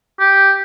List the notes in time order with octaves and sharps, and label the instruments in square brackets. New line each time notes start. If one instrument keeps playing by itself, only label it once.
[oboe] G4